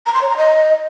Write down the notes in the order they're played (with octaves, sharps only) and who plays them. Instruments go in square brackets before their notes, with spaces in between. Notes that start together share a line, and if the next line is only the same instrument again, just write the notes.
[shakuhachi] A#5
C6
C#5
A#5
D#5